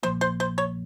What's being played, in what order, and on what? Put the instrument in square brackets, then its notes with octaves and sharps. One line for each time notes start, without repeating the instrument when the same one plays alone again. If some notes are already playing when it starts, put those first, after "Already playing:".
[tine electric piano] A#1 A#2 F3 A#3 [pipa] C5
[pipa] C5
C5
C#5